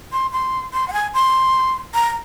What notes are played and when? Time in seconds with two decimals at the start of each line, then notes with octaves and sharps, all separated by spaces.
0.12 C6
0.32 C6
0.73 C6
0.88 F#5
0.93 G#5
1.14 C6
1.94 A#5